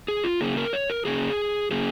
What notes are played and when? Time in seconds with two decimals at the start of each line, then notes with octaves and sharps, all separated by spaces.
0.08 G#4
0.24 F4
0.41 C#3 A#3 C#4 G#4
0.57 A#4
0.73 C#5
0.90 A#4
1.05 C#3 A#3 C#4 G#4
1.71 C#3 A#3 C#4 G#4